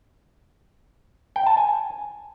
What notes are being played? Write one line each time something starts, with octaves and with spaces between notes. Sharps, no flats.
G5
A5
G#5